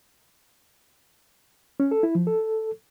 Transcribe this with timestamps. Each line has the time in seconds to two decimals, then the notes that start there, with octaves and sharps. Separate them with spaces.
1.80 C#4
1.91 A4
2.03 E4
2.15 F3
2.27 A4